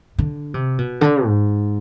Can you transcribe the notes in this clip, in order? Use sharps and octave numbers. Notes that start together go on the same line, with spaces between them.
D3
C3
B2
D3
G#2